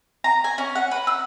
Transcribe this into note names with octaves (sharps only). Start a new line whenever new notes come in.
A#5
G#5
C#4
F#5
B4
E6